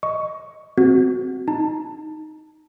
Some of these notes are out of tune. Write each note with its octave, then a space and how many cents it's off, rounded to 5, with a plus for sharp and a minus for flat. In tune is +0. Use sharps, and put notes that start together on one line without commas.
D#5 +0 C#6 +10
C4 +0 F#4 +0
D#4 +0 A5 +15